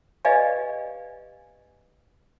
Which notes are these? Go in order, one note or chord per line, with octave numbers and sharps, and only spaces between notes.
G4 B4 D5 D#5 F5 G#5